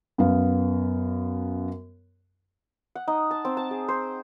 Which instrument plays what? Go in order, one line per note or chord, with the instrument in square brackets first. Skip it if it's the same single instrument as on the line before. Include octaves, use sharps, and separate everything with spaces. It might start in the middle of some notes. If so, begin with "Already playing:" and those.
[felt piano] F#2 B3 F5
[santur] F#5
D#4
A5
C4
A5
G#4
C5